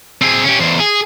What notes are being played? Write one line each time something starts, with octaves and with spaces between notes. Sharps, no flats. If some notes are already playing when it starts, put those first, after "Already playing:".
C4 G#4
C#4 G4
E2 C5
G#4